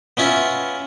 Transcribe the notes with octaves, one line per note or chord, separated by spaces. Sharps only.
B3 C#4 E4 F4